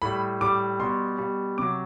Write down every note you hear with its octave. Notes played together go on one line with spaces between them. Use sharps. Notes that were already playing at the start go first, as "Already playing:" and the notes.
A2 G3 B5
A2 G3 D6
B2 G3 C6
B2 G3
C3 F#3 D6